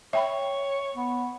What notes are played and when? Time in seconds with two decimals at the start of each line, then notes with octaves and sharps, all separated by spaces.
0.13 C#5 E5 G5 B5
0.96 B3